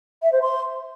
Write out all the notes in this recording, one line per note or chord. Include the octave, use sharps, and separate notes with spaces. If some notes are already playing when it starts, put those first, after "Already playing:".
E5
C5
C6